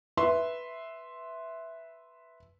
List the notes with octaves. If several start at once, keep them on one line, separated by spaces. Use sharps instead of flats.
B4 E5 C6